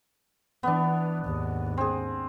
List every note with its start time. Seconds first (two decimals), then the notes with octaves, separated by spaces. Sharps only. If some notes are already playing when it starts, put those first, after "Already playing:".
0.63 E3 B3 D4
1.25 D#2 G#2
1.77 C4 G#4